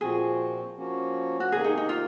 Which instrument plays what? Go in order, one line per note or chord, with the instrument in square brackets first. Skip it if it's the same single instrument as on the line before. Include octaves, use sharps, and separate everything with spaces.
[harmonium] A#2 F3 C4 F#4 [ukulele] G#4
[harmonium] F3 A#3 C#4 F#4
[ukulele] F#4
[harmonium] C3 D#3 A#3 [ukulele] G#4
[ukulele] D#4
D#4
F4